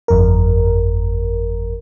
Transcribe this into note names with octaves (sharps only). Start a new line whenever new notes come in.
G1 F2 A#4